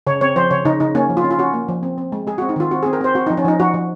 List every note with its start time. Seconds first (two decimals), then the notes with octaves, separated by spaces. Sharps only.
0.07 C#3 C#5
0.21 C4 C#5
0.36 F3 C5
0.51 C#3 C#5
0.65 C#3 D#4
0.80 C#3 D#4
0.95 A#3 C#4
1.10 F3
1.17 F4
1.24 C#4
1.31 F4
1.39 C#4 F#4
1.54 A#3
1.69 F3
1.83 C4
1.98 C4
2.12 G#3
2.27 G#3 G#4
2.38 C4 F#4
2.49 D#4
2.56 D#3 F4
2.71 C4 F#4
2.83 C4 G#4
2.93 A#4
3.01 C4 C5
3.15 C4 F#4
3.26 F3 D#4
3.37 C#4
3.45 F3 D#4
3.59 F3 F#4
3.74 F3